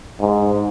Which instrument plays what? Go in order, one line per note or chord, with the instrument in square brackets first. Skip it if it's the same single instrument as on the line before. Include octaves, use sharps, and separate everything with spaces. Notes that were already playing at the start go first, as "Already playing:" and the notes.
[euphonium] G#2